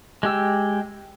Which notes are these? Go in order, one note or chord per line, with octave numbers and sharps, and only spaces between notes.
G#3 G4 E6